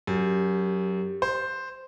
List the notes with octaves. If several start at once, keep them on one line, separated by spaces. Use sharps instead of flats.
F#2 G4
C5